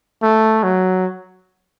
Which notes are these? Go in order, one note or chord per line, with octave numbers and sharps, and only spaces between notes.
A3
F#3